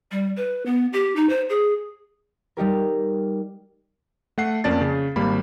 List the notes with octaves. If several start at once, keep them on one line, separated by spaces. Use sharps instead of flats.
G3
B4
B3
G4
D#4
C5
G#4
G3 D#4 G4 A#4
A3 F#5 C7
F2 A#3 C#4 D5 A5 A6
C#3
G#1 G3 A#3 B5